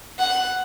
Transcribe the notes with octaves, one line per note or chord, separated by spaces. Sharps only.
F#5